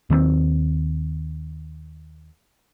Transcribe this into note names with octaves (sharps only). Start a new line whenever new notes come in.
D#2 D#3 G3 C4